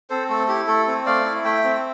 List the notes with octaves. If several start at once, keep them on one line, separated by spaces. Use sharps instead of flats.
C4 A4 C5
A3 A4
E4 G4
A3 A4
C4
A3 D5 F5
E4
A3 E5 G5
C4